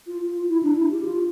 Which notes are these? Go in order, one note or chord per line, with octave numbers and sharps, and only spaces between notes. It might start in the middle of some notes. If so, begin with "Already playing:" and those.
F4
F4
E4
D4
E4
G4
F4